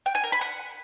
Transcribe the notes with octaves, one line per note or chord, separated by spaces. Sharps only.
G5
G#5
A#4
B5
F#5